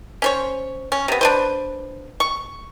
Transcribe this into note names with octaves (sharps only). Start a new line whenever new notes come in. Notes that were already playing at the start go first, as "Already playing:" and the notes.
C#4 C5 C#5
C#4
C3 B3
D4 B4 C5
C#6